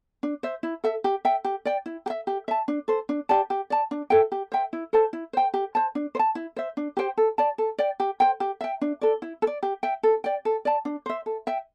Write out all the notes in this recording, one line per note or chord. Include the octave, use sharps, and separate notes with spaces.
D4
C5 E5
E4
A4 E5
G4
E5 G5
G4
D5 G5
E4
G4
E5
G4
E5 A5
D4
A4 C5
D4
G4 D5 A5
G4
D5 A5
D4
A4 E5 G5
G4
C5 E5 G5
E4
A4 C5 A5
E4
C5 G5
G4
C5 A5
D4
C5
A5
E4
C5 E5
D4
G4 C5 G5
A4
D5 A5
A4
D5 G5
G4
C5 G5
G4
E5 G5
D4
A4 D5
E4
A4
D5
G4
E5 G5
A4
D5 G5
A4
D5 A5
D4
C5 E5
A4
E5 G5